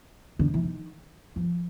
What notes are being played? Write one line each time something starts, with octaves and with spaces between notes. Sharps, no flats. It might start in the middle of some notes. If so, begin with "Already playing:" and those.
D3
E3
D#3
F3